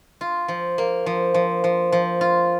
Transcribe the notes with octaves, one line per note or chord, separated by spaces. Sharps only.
F4
F3
A#3
F3
F3
F3
F3
F4